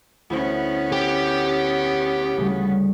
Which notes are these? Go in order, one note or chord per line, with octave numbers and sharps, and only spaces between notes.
D2 B3 C#4 E4 C5
G4 G5
D2 C#3 G3